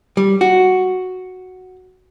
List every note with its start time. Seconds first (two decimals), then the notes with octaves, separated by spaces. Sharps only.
0.17 G3
0.41 F#4